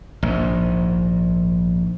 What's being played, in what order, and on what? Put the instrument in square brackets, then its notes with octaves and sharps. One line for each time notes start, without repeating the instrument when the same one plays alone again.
[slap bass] A#1 G#2